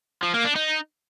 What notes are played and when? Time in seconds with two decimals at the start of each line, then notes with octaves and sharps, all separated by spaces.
0.23 F3
0.34 A#3
0.45 D4
0.56 D#4